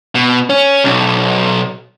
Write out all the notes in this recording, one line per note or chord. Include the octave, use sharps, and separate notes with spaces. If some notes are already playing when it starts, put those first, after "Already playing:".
B2
C#4
B1